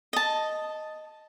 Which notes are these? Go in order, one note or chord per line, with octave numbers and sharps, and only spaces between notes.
D#5 A5